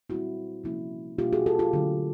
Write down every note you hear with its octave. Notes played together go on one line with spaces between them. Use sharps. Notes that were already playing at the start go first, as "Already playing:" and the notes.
A#2 G3 C4 E4 F#4
C3 F3 A#3 C#4 E4
B2 G3 A#3 D4 F4 G4
F#4 G#4
G4 A4
F4 G4
D3 F#3 A3